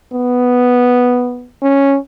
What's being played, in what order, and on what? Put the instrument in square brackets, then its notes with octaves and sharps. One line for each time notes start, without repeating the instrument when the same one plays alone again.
[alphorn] B3
C#4